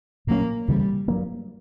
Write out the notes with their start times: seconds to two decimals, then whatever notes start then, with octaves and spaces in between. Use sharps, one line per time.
0.27 A#2 F#3 A#3 C#4
0.68 D2 C#3 E3 G3
1.08 G2 F#3 A#3